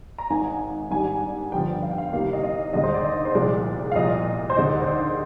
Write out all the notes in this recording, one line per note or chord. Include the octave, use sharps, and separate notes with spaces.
A#5
G#1 G#2 D#3 G#5
G#2 D#3 G3 D4 G#5
G1 G2 D3 F3 G5
F5
G5
F5
C2 C3 D#3 A#3 F5
D#5
D#5
D#2 D3 G#3 D#4 D#5
C5
D5
D#5
C5
C2 A#2 F3 G#3 D5
F5
C2 A#2 F3 D#5
C5
D#2 D3 G#3 D#4 D5
C5
D5